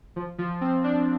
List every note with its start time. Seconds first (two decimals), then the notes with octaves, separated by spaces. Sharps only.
0.16 F3
0.38 F3
0.61 C4
0.84 D4